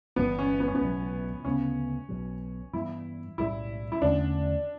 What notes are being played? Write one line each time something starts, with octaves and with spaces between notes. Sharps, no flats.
G1 G2 E3 G3 B3
C#4
B3
C#4
B3
B1 B2 F#3
D2 C#3 G3 B3 C#4
B1 B2 F#3
G2 E3 G3 B3 E4
B1 A2 G3 E4
E4
E2 D3 A3 C#4 D4